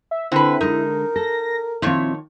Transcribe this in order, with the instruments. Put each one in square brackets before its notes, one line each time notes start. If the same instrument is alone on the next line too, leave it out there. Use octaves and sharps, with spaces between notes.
[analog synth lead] E5
[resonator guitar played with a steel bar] D3 B4 [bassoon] C4 [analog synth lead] E4
[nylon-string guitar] D3 G#3 [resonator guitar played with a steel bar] D#4 [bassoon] A#4
[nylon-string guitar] A4 [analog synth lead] A#6
[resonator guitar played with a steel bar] A#2 F3 C#5 [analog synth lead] D#3 [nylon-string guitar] C4 E4